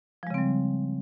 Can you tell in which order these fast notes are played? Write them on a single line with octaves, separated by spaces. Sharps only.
F3 G#3 C#3 C4 G3